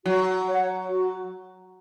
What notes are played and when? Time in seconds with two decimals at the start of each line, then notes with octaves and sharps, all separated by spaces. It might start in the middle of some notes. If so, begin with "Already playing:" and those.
0.05 F#3 F#4
0.47 C#5 F#5
0.89 F#4